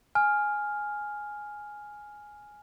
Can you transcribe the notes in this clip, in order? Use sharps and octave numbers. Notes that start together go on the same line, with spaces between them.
G#5 F6